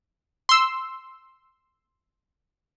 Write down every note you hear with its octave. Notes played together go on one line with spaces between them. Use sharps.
C6 E6